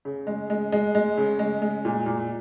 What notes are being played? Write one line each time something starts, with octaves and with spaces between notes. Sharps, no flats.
C#3
G#3
G#3
G#3
G#3
C#3
G#3
G#3
A#2
A#2